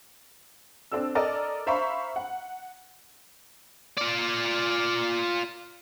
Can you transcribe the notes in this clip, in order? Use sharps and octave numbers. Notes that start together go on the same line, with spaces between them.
C4 D4 A4 E6
A4 A#4 D5 D#5
C5 E5 F5 A#5 B5 C#6
F#5
F4 D5